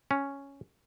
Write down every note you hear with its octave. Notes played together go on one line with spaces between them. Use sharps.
C#4